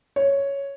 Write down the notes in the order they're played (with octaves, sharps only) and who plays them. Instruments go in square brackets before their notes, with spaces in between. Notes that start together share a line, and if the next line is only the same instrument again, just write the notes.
[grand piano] C#5